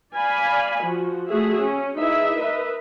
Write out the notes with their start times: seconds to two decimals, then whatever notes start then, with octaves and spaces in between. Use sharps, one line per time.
0.16 D5 F5 G#5 B5
0.84 F3 F#4
1.29 A3 F#4 G#4 E5
1.63 C#4
1.99 D#4 E4 G#4 B4 E5
2.39 A#4 B4 D#5 E5